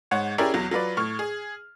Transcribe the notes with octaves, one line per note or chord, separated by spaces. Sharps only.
G#2 C#5 F#5
C#4 E4 G4 G#4 A#4 D5
B1 E2 F#3
F#3 F4 B4 D5
A2 C#6 F6
G#4